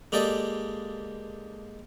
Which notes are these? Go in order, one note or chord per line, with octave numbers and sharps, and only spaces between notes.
G#3 A#3 G4 A4 D5 D#5